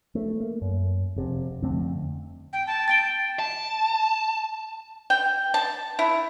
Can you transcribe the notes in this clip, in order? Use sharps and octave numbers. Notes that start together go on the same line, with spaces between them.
A3
A#3
F#2
F1 C3
F2 D3 A3 C4
G5
A5
G5 A6 D7 G7
A5
G5
A5
E4